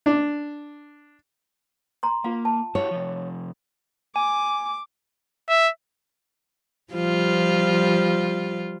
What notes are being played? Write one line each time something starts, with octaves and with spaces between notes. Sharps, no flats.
D4
A#5 C6
A#3 F4 F5
A5
E4 F#4 G4 C#5
C3 F3
G#5 D6
E5
F3 G3 F4